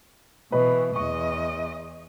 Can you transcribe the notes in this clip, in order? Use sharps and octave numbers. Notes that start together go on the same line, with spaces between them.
B2 E3 B4 D#5
E2 D#5 C#6